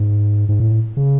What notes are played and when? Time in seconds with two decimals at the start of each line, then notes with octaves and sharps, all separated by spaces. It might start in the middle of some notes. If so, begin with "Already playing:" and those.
Already playing: G#2
0.49 G#2
0.60 A2
0.97 C#3